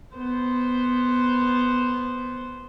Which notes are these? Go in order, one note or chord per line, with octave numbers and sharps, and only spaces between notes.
B3 C5